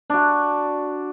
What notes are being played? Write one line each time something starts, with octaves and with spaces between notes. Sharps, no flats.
D4 F#4